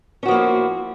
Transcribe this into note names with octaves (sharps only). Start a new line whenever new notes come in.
F3 A#3 C#4 E4 F#4